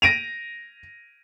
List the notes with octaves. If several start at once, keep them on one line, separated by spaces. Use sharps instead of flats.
A#6 D7 D#7 F7